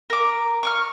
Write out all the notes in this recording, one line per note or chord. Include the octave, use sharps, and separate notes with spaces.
A#4 D6
C#6 D6 F6